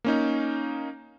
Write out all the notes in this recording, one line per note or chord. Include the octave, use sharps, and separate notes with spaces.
A#3 C#4 D#4